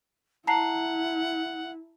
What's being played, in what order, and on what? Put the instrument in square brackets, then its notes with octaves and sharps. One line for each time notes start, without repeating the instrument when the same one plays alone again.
[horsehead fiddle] E4 [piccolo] F#5 [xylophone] A5 A#5 C7